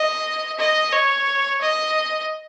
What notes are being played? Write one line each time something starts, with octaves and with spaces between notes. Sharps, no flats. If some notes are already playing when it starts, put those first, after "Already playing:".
Already playing: D#5
D#5
C#5
D#5